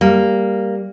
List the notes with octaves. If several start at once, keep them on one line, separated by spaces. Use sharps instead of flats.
G3 A#3